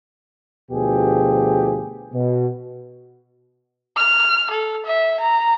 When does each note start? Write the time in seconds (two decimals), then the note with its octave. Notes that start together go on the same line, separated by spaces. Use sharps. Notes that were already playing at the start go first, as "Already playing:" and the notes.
0.71 D2 B2 F3 G4 G#4
2.13 B2
3.97 F6
4.51 A4
4.86 E5
5.20 A#5